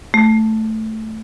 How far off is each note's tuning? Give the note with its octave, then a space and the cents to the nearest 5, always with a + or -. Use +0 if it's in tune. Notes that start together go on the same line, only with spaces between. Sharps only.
A3 +0